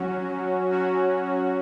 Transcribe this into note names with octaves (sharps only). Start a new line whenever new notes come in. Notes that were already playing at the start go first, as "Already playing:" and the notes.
Already playing: F#3 C#4 F#4
F#3 C#4 F#4